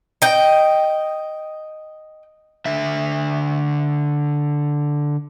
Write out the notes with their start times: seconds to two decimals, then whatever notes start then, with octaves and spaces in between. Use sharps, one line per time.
0.22 D#5 G5
2.66 D3 E5